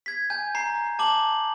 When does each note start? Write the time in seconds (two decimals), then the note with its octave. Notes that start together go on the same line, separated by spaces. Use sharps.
0.06 G#6 B6
0.30 G#5 G6
0.55 A#5 C7
0.99 A5 D6 F#7